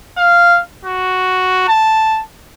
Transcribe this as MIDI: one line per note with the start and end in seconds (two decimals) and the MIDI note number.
0.18 0.60 77
0.85 1.66 66
1.68 2.22 81